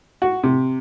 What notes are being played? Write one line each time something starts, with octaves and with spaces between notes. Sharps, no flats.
F#4
C3